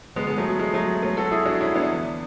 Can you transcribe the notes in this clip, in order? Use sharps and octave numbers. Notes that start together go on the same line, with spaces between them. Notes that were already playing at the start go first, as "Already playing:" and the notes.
D2 D3 G#3 B3
G#3 B3
F#3 A3
F#3
G#3
F#3 A3
A3 C#4
F#4 A4
E4 G#4
D4 F#4
C#4 E4
B3 D4
E2 D3